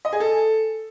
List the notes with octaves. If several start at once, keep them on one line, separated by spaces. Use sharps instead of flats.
D#5
G#4
A4